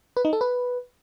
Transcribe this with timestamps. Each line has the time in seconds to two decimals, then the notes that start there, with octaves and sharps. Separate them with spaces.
0.17 B4
0.25 D#4
0.33 A4
0.41 B4